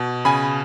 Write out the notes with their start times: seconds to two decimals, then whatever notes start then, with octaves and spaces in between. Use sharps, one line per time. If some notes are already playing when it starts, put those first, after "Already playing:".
Already playing: B2
0.25 C#3 G#5 B5